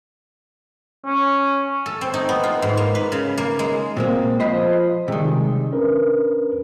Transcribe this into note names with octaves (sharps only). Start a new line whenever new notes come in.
C#4
A4
C4
D#4
B3
F4
G#2
A#3
B4
C#3
A#3
G#3
A#2 G#3 A#3 C4
F3 C5 D#5 B5
C3 D#3 G3 G#3
C#4 D4 A#4 B4